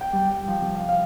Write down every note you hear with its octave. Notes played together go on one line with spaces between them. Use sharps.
G5
G3
G5
F3
C3
F5
F5